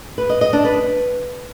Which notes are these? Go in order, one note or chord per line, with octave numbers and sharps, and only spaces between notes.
B4
D#5
D#5
D4
B4